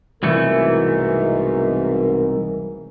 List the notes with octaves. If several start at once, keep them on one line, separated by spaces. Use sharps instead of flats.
C2 G#2 B2 E3 A3 A#4